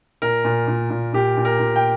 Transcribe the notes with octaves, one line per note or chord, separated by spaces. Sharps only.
A#2 A#4
A#2
A#2
A#2
A#2 G4
A#2
A#4
A#2
G5